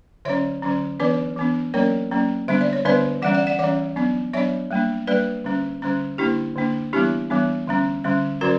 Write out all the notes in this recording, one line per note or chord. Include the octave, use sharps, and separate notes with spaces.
D3 F#3 C#4 C#5 E5
D3 F#3 C#4
E3 B3 D4 B4 D5
E3 B3 D4
F#3 A#3 C#4 A#4 C#5
F#3 A#3 C#4
D3 G3 B3 D4 E5
D5
C#5
D3 G3 B3 D4 B4 D5
E3 G3 C#4 D5 F#5
D5 F#5
D5 F#5
E3 G3 C#4 D5 F#5
F#3 B3 D4
F#3 B3 D4 C#5 E5
G3 A#3 D4
G3 A#3 D4 B4 D5
D3 G3 C#4
D3 G3 C#4
D3 A#3 D4 E4 G4
D3 A#3 D4
E3 G3 B3 D4 E4 G4
E3 G3 B3 D4
D3 G3 C#4
D3 G3 C#4
D3 F#3 C#4 F#4 A#4